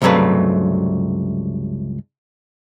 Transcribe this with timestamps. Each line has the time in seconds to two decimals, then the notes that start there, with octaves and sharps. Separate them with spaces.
0.02 C#2 G2 C3 F#3 A3 B4